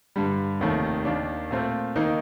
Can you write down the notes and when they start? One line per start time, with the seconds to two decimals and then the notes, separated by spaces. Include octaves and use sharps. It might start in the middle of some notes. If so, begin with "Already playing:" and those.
0.16 G2 D3 G3
0.60 F1 D#2 D#3 A3
1.05 D#2 D#3 A#3 D4
1.51 A#2 A3 C4 F4
1.96 D#3 A#3 D#4